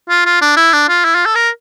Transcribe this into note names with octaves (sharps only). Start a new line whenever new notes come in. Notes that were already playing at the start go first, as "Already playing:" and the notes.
F4
F4
D4
E4
D4
F4
E4
F4
A4
A#4